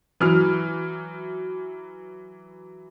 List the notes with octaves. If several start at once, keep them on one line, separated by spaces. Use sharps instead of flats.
E3 F#3 F6